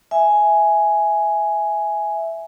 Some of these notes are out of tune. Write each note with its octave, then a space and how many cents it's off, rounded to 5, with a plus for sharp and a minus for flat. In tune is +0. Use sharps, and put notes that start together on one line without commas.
E5 +0 G#5 +5